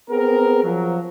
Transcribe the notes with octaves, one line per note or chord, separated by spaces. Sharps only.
B3 C4 G#4 A#4
F3 F#3